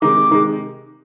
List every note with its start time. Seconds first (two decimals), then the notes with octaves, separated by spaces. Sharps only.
0.02 C3 D#3 G#3 D#4 D6
0.31 C3 D#3 G#3 D#4